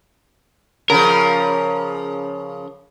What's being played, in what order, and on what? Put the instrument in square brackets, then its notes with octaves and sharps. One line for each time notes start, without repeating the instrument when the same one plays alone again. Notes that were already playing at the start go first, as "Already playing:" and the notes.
[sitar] C#3 F3 [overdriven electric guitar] A#4